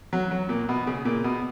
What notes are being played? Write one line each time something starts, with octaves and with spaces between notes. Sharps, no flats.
F#3
F#3
A#2
B2
C#3
A#2
B2